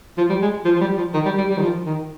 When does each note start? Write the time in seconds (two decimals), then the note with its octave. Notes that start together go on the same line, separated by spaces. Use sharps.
0.18 F3
0.29 G3
0.42 G#3
0.65 F3
0.75 F3
0.81 G3
0.98 F3
1.14 D#3
1.25 G3
1.38 G3
1.50 G3
1.57 D#3
1.62 F3
1.86 D#3